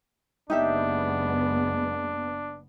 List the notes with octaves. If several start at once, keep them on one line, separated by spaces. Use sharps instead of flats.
F#1 G#3 B3 D4 D#4 G4 E5